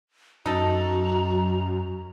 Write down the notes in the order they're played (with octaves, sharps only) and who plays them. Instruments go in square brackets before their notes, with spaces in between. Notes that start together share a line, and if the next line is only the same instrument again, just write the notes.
[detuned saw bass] F#2 [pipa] D#4 A4 [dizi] F#4 [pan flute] A#5